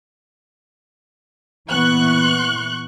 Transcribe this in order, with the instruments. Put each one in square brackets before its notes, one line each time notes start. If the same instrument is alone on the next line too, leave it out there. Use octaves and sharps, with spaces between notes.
[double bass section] A#2 E3 B3 [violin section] C#6 F#6